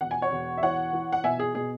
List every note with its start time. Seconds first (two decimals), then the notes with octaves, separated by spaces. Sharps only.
0.01 E1 F#5
0.11 G#5
0.22 C#5 F#5
0.32 E1
0.58 E5
0.63 E3 C#5 F#5
0.93 E3
1.12 F#5
1.24 B2 E5 G#5
1.39 G#4
1.55 B2 G#4